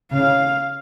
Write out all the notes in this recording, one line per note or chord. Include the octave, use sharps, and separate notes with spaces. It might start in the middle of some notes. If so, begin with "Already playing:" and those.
C#3 F5